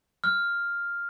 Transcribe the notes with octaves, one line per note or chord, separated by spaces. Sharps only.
F6